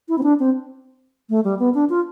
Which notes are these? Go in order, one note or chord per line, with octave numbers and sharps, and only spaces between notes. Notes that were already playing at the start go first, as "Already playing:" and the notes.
E4
C4
D4
C4
A3
G3
B3
D4
F4